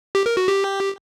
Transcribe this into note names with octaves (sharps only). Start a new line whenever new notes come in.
G4
A#4
F#4
G4